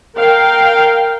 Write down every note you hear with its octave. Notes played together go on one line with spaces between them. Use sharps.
A#4 F5 G5